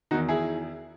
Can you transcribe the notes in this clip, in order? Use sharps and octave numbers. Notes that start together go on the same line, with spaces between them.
E2 D#3 D#4 F#4
E4 G#4